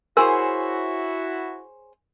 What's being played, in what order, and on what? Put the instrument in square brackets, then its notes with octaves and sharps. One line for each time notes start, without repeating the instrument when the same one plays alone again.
[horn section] E4 F#4 [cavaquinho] G#4 C5 C#5 [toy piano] A#4 G#5